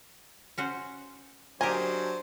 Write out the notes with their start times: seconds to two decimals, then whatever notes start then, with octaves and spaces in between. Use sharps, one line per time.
0.58 C#4 F#4 C5
1.61 F#3 D4 G4 A#4 C5 D#5 G#5